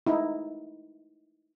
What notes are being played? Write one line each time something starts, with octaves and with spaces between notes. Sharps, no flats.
D#4 E4